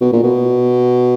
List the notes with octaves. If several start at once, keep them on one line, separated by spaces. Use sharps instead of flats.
B2
A#2
B2